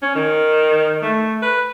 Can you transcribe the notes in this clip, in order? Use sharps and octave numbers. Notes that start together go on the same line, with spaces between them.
C#4
D#3
A3
B4